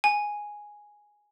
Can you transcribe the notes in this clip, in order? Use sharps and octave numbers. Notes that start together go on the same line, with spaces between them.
G#5